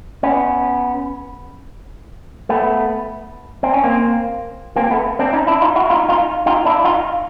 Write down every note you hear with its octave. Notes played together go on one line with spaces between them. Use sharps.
B3 C#4
A3 B3
C4
C#4
A#3 C4
A#3 C4
A3 B3
C4 D4
C#4 D#4
D4 E4
D#4 F4
E4 F#4
D#4 F4
D#4 F4
D#4 F4
D4 E4
D#4 F4